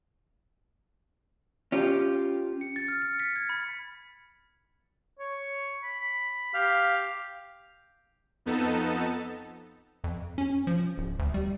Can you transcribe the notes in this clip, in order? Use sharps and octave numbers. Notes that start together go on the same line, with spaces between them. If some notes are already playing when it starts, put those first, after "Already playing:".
C#4 F4 G4
C#7
A6
F6
C#7
B6
G#6
B5
C#5
B5
G4 F5 F6
F2 B3 D#4 A4 A5
F2
C#4
F3
D1
D2
G3